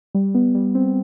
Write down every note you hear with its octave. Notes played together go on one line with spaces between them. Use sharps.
G3
B3
G3
C4